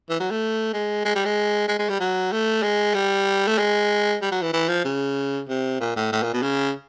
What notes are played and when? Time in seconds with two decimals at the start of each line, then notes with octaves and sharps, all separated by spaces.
0.10 E3
0.20 F#3
0.31 A3
0.73 G#3
1.05 G#3
1.15 G3
1.25 G#3
1.68 G#3
1.79 G#3
1.89 G3
2.00 F#3
2.32 A3
2.63 G#3
2.95 G3
3.47 A3
3.58 G#3
4.22 G3
4.31 F#3
4.42 E3
4.53 E3
4.69 F3
4.85 C#3
5.49 C3
5.80 A#2
5.96 A2
6.12 A2
6.23 A#2
6.33 B2
6.43 C#3